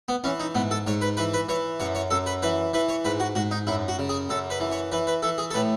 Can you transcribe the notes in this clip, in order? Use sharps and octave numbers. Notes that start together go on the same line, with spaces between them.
B3
E3 C#4
D#4
G#2 B3
A4
G#2 C#5
B4
E3 B4
B4
E3 C#5
F#2 C#5
C#5
F#2 A4
B4
E3 B4
E3 B4
C#5
G#2 B4
F#4
G#2 F#4
D#4
F#2 E4
F#4
C#3
G#4
F#2 A4
B4
E3
C#5
E3 B4
B4
E3 A4
G#4
A4
A2 B4